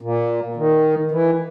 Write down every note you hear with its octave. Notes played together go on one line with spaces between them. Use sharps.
A#2
D#3
E3